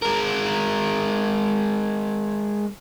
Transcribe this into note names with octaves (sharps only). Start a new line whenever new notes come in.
G#3 A#4